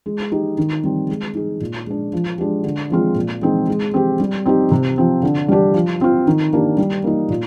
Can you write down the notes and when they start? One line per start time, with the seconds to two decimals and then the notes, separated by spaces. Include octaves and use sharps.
0.06 G#3
0.32 D#4 G4
0.58 D#3
0.84 G3 C4
1.09 G#3
1.35 D#4 G#4
1.61 A#2
1.87 G#3 D4
2.13 F3
2.38 G#3 D4 G4
2.64 D3
2.90 F3 G#3 C4 F4
3.16 A#2
3.41 G#3 C4 D#4 G#4
3.67 G#3
3.94 C4 G4
4.20 G3
4.45 C4 D#4 G4
4.71 C3
4.98 F3 C4
5.23 D3
5.48 G3 D4 G4
5.74 F3
6.01 C4 F4
6.27 D#3
6.53 A#3 D4 G4
6.78 G3
7.04 A#3 D#4
7.30 A#2